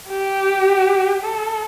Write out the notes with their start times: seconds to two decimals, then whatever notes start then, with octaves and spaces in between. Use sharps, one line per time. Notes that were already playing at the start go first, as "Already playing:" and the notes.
0.09 G4
1.23 A4